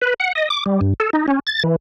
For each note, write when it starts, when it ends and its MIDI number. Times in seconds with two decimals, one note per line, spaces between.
0.02 0.14 71
0.20 0.33 78
0.35 0.49 75
0.50 0.64 86
0.66 0.80 55
0.81 0.93 43
1.00 1.10 69
1.13 1.26 63
1.28 1.39 61
1.47 1.63 93
1.64 1.76 52